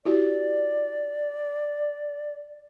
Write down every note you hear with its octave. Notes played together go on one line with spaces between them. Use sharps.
E4 F#4 G4 D5